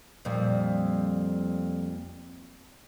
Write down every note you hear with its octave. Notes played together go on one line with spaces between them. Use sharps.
F2 A#2 G3